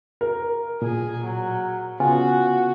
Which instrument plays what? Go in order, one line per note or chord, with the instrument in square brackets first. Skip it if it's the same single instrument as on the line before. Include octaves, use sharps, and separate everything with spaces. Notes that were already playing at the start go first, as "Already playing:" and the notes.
[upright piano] A#4
[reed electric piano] A#2 [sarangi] G#4
[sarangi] F#3
[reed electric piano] C#3 B3 F4 [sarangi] F#4 [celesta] G#5